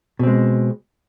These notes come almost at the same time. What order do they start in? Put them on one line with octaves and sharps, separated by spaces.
B2 C4 G#3